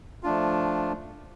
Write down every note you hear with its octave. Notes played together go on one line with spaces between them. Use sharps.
F3 A3 D4 F4